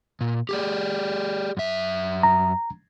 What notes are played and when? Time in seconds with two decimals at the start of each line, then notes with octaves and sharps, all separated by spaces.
0.21 A#2
0.49 G4 G#4 D5
1.57 F#2 E5
2.23 A#5